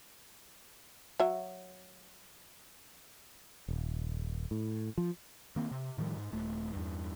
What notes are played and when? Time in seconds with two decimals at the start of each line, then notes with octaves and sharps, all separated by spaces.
1.20 F#3 E5
3.68 D#1
4.51 A2
4.98 F3
5.56 D#3 A#3 C4
5.71 C3
5.98 A2 D#3 F3 G3
6.16 G#2
6.32 D#1 A3
6.73 E2 G2